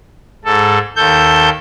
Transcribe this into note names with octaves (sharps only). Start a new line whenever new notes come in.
G#2 A4
D#2 A4 G6